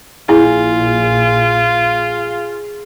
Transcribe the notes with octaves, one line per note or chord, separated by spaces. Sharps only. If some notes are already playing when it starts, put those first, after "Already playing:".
A#1 A#2 E4 F4 G#4